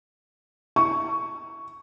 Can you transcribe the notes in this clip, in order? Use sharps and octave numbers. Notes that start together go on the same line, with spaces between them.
C#6